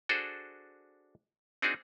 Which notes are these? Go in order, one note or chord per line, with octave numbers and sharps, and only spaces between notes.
D4 F#4 G#4 A4 C5
C4 D4 D#4 F#4 G#4